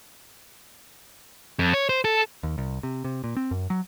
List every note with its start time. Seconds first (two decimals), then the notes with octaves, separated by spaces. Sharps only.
1.59 F2
1.74 C#5
1.89 C5
2.04 A4
2.43 D#2
2.58 C2
2.83 C3
3.05 C3
3.24 A#2
3.37 C4
3.51 F#2
3.70 F#3